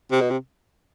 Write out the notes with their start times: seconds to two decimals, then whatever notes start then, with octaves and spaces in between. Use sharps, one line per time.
0.11 C3
0.21 B2
0.30 C3